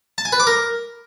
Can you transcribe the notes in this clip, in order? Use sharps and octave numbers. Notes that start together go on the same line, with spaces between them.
A5
G#5
B4
D6
A#4